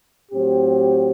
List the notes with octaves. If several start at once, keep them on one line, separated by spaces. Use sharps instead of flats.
A2 F#3 C4 G4